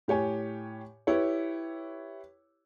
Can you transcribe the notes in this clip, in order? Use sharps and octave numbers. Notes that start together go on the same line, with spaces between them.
A2 G4 C#5 G#5
E4 G4 B4 C#5